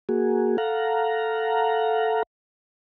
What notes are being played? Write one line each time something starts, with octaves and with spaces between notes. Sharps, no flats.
A#3 F#4 G#4
A4 F5 F#5 A#5